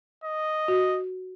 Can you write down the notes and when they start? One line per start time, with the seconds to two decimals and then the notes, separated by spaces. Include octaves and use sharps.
0.24 D#5
0.68 F#4